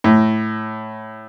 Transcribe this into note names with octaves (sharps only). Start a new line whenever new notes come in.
A2